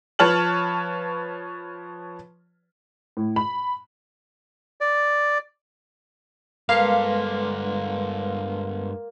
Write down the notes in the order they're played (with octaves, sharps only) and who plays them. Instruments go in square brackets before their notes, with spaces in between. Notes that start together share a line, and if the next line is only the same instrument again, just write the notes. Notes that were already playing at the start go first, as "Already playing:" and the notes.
[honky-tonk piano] F3 B4 C#5 A5 F6 F#7
A2
B5
[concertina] D5
[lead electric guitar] G2 A4 [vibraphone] G#3 B4 C6 [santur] A#3 [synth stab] F5